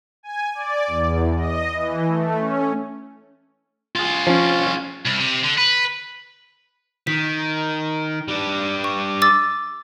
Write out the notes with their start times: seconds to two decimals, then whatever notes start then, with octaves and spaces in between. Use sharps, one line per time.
0.23 G#5
0.55 D5
0.87 E2
1.36 D#5
1.73 E3
2.07 A3
2.38 C#4
3.96 F4 G#4
4.27 F3 C#4
5.05 C2
5.20 C3
5.44 D3
5.58 B4
7.07 D#3 B6
8.28 G3 D4
8.84 C#6
9.22 D6 E6 A6